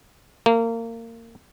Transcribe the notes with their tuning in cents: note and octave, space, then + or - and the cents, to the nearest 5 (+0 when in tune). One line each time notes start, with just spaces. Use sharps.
A#3 -25